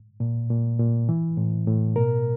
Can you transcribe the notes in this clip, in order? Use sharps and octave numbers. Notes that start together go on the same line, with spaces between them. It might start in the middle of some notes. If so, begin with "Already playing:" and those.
A#2
A#2
A#2
E3
A2
A2
B2 A#4